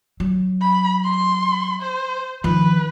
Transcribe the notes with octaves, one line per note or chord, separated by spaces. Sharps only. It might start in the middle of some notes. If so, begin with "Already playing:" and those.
F#3
B5
C6
C5
D#3 F3 B4